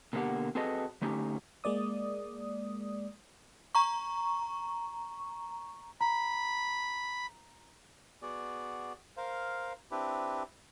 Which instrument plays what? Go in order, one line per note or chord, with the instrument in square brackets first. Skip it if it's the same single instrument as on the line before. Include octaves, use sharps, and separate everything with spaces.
[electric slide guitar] B2 D3 A#3 D4 G4 F#5
C4 F#4 G#4 A4 B4 D#5
D3 A3 C#4 D#4 G4
[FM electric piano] G#3 A#3 D5 D#6
[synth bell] A#5 C#6
[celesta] A#5 [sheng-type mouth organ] B5
[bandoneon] B3 F#4 G#4 D5
A#4 C5 F5
C4 D4 E4 G4 B4